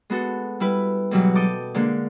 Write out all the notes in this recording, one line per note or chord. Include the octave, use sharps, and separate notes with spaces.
G#3 B3 F#4 A4
G3 E4 B4
G#2 B2 E3 F#3 G3
A4 D6 D#6 G6
D3 G#3 A#3